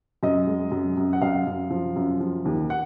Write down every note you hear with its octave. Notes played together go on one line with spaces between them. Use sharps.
F#2 D#5
G#3
F#2
F#2
F#5
F#2 F5
F#2
F3
F#2
F3
D#2
F#5